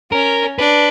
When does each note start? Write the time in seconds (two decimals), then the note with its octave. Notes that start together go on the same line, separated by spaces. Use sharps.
0.12 C#4 A#4
0.59 D4 B4